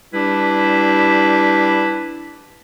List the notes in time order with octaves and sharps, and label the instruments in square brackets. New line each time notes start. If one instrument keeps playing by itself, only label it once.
[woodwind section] G3 D4 E4 G4 B4